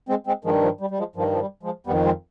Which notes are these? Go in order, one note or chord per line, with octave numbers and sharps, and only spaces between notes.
G#3 C4
G#3 C4
G2 D#3 F3 G#3
F3
G3
G3
F3 G#3
G2 D#3 F3
F3
G3
F3 G#3
F2 D#3 G3 B3
G#3 C4